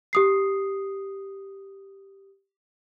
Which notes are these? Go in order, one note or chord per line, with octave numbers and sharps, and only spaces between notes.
G4 D#6 C7